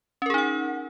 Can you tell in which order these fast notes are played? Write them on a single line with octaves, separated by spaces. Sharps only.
C#4 A#4 G#4 D#4 F#5